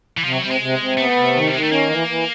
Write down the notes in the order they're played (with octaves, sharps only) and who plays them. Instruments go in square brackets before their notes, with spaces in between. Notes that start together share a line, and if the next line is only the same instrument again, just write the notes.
[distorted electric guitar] E3
[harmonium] C3 [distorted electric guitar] F3
[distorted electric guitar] F#3
[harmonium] C3 [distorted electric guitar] G3
[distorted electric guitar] G#3
[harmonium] C3
C3
[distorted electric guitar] A3 [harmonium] B3
[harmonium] C3
D#3
[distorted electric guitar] G3
[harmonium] D#3 [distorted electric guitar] G#3
[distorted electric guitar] A3
[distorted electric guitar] A#3 [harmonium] C#4
[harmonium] E3
E3